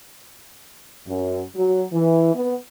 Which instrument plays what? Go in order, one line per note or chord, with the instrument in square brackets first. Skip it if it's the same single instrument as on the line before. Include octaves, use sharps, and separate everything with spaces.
[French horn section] F#2
F#3
E3
B3